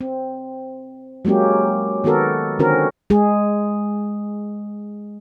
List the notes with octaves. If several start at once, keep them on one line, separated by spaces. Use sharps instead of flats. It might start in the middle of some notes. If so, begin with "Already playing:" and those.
C4
F#3 G#3 A#3 C#4 G4
D#3 B3 F#4 A4 A#4
D3 D#3 C4 C#4 F#4 A#4
G#3 G#4